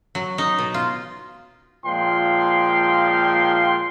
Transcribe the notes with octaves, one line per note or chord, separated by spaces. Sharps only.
F#3
D#4
B2
F4
A#2 F3 G#3 F5 G5 C6